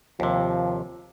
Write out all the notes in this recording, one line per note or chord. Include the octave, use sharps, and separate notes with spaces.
D#2 C3 F3